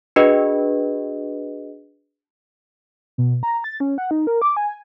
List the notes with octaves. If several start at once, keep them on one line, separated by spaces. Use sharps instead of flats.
D4 F#4 G#4 B4 D#5
B2
A#5
A6
C#4
F#5
D#4
A#4
D6
G#5